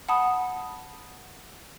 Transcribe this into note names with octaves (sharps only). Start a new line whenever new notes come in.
F#5 A5 B5 D#6